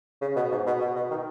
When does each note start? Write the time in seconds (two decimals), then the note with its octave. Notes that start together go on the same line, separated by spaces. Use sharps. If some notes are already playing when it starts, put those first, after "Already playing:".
0.21 C#3
0.36 B2
0.51 G#2
0.66 B2
0.81 B2
0.96 B2
1.10 D#3